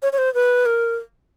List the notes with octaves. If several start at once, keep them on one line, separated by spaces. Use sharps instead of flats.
C#5
C#5
C5
B4
A#4